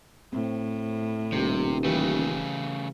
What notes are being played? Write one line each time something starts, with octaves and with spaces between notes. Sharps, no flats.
A2 C4
D#1 C3 G3 D#4
C#3 E3 A3 G4 B4